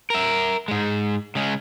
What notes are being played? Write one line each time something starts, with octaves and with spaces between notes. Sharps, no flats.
A#4 E5
G#2 G#3
C#3 G#3